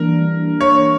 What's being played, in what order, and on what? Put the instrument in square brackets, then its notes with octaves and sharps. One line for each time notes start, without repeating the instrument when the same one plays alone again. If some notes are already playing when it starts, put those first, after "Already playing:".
Already playing: [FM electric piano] E3 G3 A#3 D4 [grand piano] A#4
[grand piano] C#5